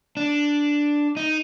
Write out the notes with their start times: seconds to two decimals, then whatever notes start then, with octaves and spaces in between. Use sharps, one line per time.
0.17 D4
1.17 D#4